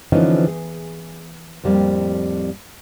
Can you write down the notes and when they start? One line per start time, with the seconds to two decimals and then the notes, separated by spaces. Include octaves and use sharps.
0.12 D3 E3 F3 B3 C#4 D#4
0.47 G#4
1.64 F2 A2 G3 A#3 C4